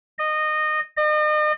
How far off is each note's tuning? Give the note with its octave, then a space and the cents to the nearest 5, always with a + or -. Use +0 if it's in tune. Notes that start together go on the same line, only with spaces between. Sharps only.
D#5 -20
D#5 -40